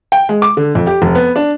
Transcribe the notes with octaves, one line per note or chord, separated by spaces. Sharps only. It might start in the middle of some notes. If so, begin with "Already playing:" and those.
G5
G#3
D6
D3
F2
G4
F1
B3
D4